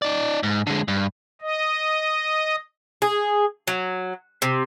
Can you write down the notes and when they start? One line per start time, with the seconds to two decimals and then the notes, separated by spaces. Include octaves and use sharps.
0.02 D#4 D5
0.43 G#2
0.67 D3 G#3
0.88 G2
1.41 D#5
3.02 G#4
3.67 F#3
4.42 C3